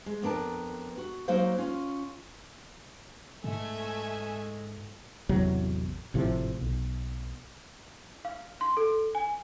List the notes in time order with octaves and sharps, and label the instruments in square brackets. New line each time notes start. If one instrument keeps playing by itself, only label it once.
[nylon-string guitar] G#3
F2 B3 D4 A#4 A5
F#4
F#3 A#3 D#4 F#4 C5 F5
C#4 F4
[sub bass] G#2 [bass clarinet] G#3 [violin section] A3 E5 G#5
[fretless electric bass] A1 E2 C3 F#3
G#1 A2 C3 F3
B1
[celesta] F5
C6
A4
G#5